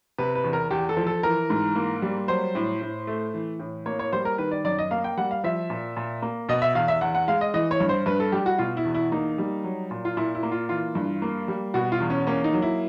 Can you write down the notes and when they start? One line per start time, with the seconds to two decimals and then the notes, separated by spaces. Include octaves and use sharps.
0.18 C3 B4
0.35 B4
0.44 E2
0.53 A#4
0.70 E2 G4
0.89 A4
0.97 F3
1.07 A4
1.23 E3 A#4
1.50 G#2
1.75 A#3
2.02 G3
2.28 F#3 C5
2.55 A2
2.81 A2
3.07 A3
3.34 E3
3.59 A2
3.86 A#3 C#5
3.99 C#5
4.13 G3 C5
4.25 A#4
4.38 D#3 B4
4.51 D5
4.64 F#2 D5
4.78 D#5
4.91 A#3 F5
5.04 G5
5.18 G3 F#5
5.31 F5
5.44 F3 E5
5.70 A#2
5.97 A#2
6.22 A#3
6.49 B2 D#5
6.62 E5
6.75 E2 F5
6.88 E5
7.01 E2 F#5
7.15 F#5
7.28 G#3 F5
7.41 D#5
7.54 E3 D#5
7.71 C#5
7.80 G2
7.89 C5
8.06 G2 B4
8.20 A4
8.32 G3 G4
8.46 F#4
8.58 B2 F4
8.77 E4
8.85 E2
8.94 E4
9.12 A#3 D#4
9.38 G3
9.64 F#3
9.91 A#2
10.05 F4
10.17 A#2 E4
10.35 E4
10.43 A#3
10.52 F4
10.69 E3 F4
10.95 G2
11.22 A#3
11.48 G3
11.74 B2 F#4
11.92 F4
12.00 E2
12.10 C#4
12.27 A#3 C#4
12.44 D#4
12.53 F#3
12.62 E4